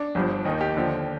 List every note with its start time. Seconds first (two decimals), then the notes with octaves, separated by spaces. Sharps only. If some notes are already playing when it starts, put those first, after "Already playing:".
Already playing: D4
0.15 G1 G2 F3
0.45 D#2 D#3 D#4
0.61 G4
0.75 D#2 D3 F3